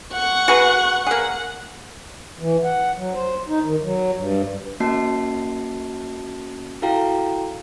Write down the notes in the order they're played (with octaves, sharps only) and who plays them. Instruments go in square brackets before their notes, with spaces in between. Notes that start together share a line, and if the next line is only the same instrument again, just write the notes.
[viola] F#5 C#6
[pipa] F#4 G#4 B4
[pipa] A#3 G#4 [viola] F#5
[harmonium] E3
F#5
F#3
C5
D#4
D#3
F#3
G2
[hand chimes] A#3 C#4 F#4 D#5 A5 C7
E4 F#4 A4 F5 G5 A#5